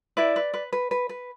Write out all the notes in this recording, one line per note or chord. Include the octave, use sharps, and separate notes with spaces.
E4 B4 D5
B4
B4
B4
B4
B4